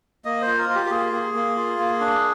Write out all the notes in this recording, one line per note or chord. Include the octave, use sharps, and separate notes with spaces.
A#3 D#5
C5
F4
A#4
F4
G4
G4
A#3 G#4
A#3
A#3
F4
A#3
D4